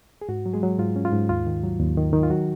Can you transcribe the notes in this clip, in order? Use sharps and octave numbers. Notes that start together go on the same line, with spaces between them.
G#4
G#2 F#4
F#3
G#3 G#4
F#3
G#2 F4
C#4
F4
G#2
D#2 F4
D#3
F#3
D#2
D#3
D#3
F4
F#3 F#4